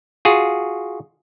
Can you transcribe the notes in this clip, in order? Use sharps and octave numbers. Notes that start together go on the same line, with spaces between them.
F4 F#4 G#4